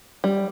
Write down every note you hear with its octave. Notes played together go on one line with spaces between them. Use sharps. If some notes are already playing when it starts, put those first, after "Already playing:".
G3